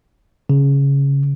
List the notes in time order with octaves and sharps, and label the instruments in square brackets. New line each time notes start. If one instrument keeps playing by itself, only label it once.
[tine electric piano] C#3